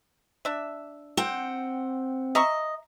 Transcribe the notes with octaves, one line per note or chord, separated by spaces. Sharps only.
D4 E5
C4 F#5 G5
D#5 E5 A#5 C#6